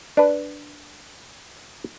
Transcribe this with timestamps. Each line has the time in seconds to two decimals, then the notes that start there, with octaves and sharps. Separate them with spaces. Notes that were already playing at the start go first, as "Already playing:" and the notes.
0.17 D4 B4